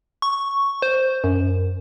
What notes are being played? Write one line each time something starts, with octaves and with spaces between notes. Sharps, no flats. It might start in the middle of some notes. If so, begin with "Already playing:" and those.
C#6
C5
F#2